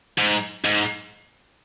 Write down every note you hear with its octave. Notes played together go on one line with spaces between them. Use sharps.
G#2
G#2